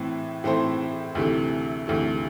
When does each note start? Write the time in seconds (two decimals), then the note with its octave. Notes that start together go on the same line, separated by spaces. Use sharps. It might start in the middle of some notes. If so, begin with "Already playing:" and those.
Already playing: A2 E3 C4
0.44 A2 E3 C4 A4 C5
1.15 D2 C3 E3 A3
1.87 D2 C3 E3 A3